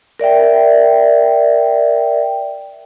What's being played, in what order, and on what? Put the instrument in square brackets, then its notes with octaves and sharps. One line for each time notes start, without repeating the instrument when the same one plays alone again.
[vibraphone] A#4 D5 E5 G5